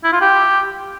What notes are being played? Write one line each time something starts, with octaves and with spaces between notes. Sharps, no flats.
E4
F4
G4